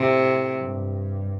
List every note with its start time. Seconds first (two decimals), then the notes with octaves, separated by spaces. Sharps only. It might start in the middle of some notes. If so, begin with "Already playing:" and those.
Already playing: A2 C3
0.60 G2